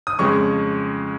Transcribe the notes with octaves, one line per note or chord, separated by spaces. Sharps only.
D#6
F2 C#3 G#3 C#6